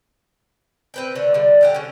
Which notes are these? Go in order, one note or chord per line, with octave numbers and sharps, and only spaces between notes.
C4 B4 G5
D3 A3
D3 G3
D3 G4 F#5
D3 C#4